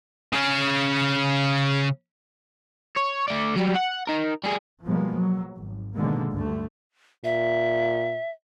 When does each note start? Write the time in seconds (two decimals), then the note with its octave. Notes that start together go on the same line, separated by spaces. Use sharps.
0.33 C#3 C#4
2.96 C#5
3.28 A3 D5
3.56 F#3 G3
3.75 F#5
4.07 D#4 A#4
4.44 G3 G#4
4.84 B2 F3 G3 G#3 A#3 B3
5.15 F#3
5.56 G#1
5.96 G#2 B2 D3 D#3 G#3 A#3
6.31 D2 G2 D3 A3
7.24 A#2 E5